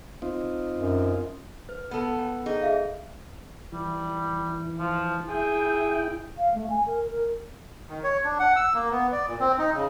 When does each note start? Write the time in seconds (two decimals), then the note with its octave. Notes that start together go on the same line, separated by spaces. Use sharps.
0.22 C4 D#4 F4
0.77 F#2
1.69 B4
1.91 B3 A4
2.19 G5
2.46 D#4 G#4 G5
2.61 G#4 E5 F5
3.72 E3 G3
4.79 F3
5.29 E4 G#4 G5
6.38 F5
6.54 A3
6.70 G#5
6.87 A#4
7.06 A#4
7.89 D#3
8.04 C#5
8.24 D4
8.39 F#5
8.56 E6
8.74 A#3
8.91 B3
9.12 D5
9.27 A#2
9.40 C4
9.59 D#4
9.74 C#3